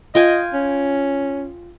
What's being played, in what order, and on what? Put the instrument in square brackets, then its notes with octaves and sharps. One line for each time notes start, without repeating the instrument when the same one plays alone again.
[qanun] F4 G5 G#5 [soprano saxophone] D#5
[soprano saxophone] C#4